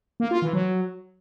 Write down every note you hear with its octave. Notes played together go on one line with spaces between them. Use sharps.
A#3
F4
E3
F#3